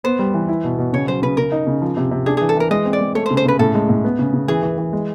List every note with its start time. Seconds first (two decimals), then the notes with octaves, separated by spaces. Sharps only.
0.04 B3 C5
0.19 G3
0.34 E3
0.49 E4
0.64 B2
0.78 B2
0.93 C#3 C#5
1.08 F#3 C5
1.22 C#3 B4
1.37 C#3 A#4
1.52 D#4
1.67 C#3
1.82 F3
1.97 C3
2.11 C3
2.26 D4 G#4
2.37 E3 G#4
2.49 A4
2.56 E3 A#4
2.71 G#3 D#5
2.85 C4
2.93 D5
3.01 G#3
3.15 A3 C#5
3.26 C5
3.31 C#3
3.37 C5
3.45 C#3 B4
3.59 A2 A4
3.75 G#3
3.89 A2
4.04 B3
4.19 C#3
4.34 C#3
4.48 E3 G#4
4.63 E3
4.78 E3
4.93 G#3